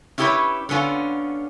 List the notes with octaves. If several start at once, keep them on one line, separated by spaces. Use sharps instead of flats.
C#4 E4 G4 A4 B4 C#5
D3 B3 C#4 F4